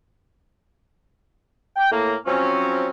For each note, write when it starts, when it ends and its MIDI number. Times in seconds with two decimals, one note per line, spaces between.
1.76 1.87 79
1.92 2.15 45
1.92 2.15 58
2.26 2.90 53
2.26 2.90 54
2.26 2.90 60
2.26 2.90 61